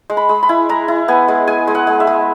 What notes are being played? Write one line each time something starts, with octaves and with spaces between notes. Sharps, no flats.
G#3
B5
G#3
B5
E4
G#3 A#5
E4
B3 G#5
G#3
G#3 G#5
G#3
F#5
G#3
E5
G#3